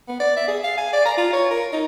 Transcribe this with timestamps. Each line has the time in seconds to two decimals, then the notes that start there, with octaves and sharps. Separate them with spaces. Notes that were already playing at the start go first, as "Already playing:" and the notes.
0.08 B3
0.20 D5
0.36 E5
0.48 G#4
0.64 F5
0.77 G#5
0.93 D5
1.06 A#5
1.17 F4
1.33 C#5
1.51 A#4
1.73 D#4